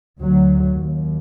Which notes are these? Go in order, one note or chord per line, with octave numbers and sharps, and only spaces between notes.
D2 F#3
D#2